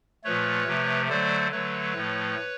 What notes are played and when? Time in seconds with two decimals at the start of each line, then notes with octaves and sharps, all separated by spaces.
0.24 A#2 F3 A3 B4 C#5
0.67 C3 F3 A3
1.09 D3 F#3 A3 C5 D5
1.51 D3 F#3 A3 B4 C#5
1.95 A2 F3 A3